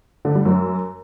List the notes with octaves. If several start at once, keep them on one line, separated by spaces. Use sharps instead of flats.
D3
G3
F#2